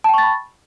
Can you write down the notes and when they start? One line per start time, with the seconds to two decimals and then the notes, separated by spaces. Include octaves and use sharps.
0.04 A5
0.09 G5
0.14 C#6
0.18 A6
0.23 B5